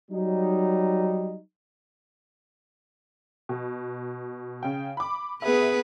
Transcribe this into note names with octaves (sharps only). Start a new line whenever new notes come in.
F#3 G3 D#4
B2
C#3 G5
B5 D6
B3 G#4 B4 E5